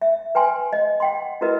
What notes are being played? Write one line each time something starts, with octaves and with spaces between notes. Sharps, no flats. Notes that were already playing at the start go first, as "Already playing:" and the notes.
E5
B4 G5 G#5 C6
D#5
F#5 G5 C6
E4 F#4 A#4 B4 D#5